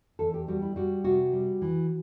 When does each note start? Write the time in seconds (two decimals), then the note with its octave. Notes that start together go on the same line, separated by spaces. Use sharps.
0.19 E2 A4
0.34 G4
0.48 G3 F#4
0.62 E4
0.76 G3 F#4
1.04 C3 F#4
1.32 G3
1.62 E3